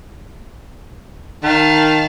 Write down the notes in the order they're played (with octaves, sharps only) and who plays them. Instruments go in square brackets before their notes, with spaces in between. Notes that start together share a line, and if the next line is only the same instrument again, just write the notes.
[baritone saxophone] D#3 [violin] F5 A5